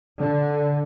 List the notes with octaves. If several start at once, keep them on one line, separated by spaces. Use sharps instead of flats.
D3